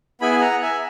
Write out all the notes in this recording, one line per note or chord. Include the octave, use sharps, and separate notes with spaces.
B3 E4 G#4 G#5 B5
G#5
F#5 A#5
E5 G#5